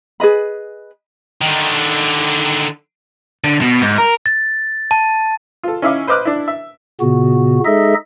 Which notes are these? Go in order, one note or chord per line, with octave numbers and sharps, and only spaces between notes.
G#4 B4 D#5 B5
D3 D#3
D3
B2
G#2
A#4
A6
A5
F4 A4
C#4 D#4 E4 E5 F5 D6
B4 C5 D#5 D6 F6 F#6
D4 E4
E5
A#2 C#3 B3 F#4
G#3 D#4 G#4 A4 D#5 E5